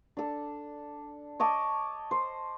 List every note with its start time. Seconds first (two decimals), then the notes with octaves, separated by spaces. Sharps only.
0.17 D4 A4
1.40 C#5 D#5 A5 D6
2.11 C5